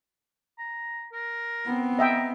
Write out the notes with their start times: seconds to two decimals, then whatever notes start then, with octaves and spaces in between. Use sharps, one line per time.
0.58 A#5
1.13 A#4
1.66 B3 C4
1.99 D#5 E5 G5 A#5